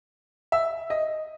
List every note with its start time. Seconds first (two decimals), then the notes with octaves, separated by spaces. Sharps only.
0.52 E5
0.90 D#5